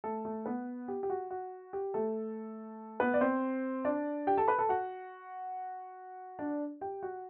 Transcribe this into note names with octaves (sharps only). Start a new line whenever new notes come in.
A3 A4
A3 A4
B3 B4
G4
G4
F#4
F#4
G4
A3 A4
B3 B4
D5
C4 C5
D4 D5
G4 G5
A4 A5
B4 B5
A4 A5
F#4 F#5
D4 D5
G4 G5
F#4 F#5